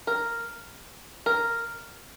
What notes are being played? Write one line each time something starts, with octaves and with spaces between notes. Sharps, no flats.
A#4
A#4